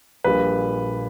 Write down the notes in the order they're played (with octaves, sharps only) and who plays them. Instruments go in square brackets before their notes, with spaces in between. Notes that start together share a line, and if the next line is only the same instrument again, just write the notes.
[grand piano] A#1 A#2 G3 B4